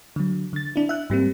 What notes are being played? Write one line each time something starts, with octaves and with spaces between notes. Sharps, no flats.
D3 F#3
D3 A6
D4 E4
E5 F#6
G#2 G3 A#3 C4